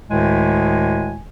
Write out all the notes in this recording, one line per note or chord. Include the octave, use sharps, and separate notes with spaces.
D2 A2 D#3 G#3 G#5